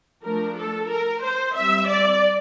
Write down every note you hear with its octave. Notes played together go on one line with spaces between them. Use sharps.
F3 A3 D4 A#4
A4
A#4
C5
G3 C4 E5
D5